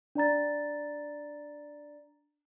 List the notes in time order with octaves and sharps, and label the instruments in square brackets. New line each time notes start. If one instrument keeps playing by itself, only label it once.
[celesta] D4 D5 A#5 A6